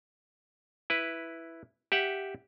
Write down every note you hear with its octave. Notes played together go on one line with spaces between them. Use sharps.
E4 B4
G4 E5 F#5